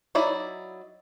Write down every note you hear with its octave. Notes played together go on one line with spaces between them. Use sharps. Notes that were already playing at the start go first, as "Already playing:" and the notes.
F#3 D#4 E4 D5